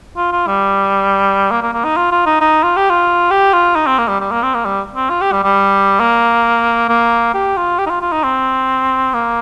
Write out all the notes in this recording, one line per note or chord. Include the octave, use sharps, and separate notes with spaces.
F4
F4
G3
A#3
A#3
A#3
D#4
F4
F4
D#4
D#4
F4
G4
F4
G4
F4
D#4
C4
A#3
G3
G3
A#3
C4
A#3
G3
C4
F4
G4
G3
G3
A#3
A#3
G4
F4
G4
D#4
F4
F4
D#4
C4
A#3